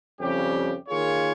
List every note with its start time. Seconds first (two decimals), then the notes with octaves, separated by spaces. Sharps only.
0.20 F2 C#3 G3 C#4 G4
0.89 D#3 A#3 F4 G#4 C#5